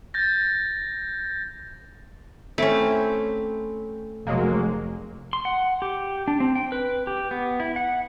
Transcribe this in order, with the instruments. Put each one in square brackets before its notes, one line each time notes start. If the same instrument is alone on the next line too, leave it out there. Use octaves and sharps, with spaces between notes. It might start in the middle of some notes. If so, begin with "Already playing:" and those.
[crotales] G6 A6 A#6
[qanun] A3 C4 D6 [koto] C#4 E4
[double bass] F1 [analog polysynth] F#3 G#3 A#3
[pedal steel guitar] C6
F#5
G4
D4
C4
G5
B4
G4
B3
E4
F#5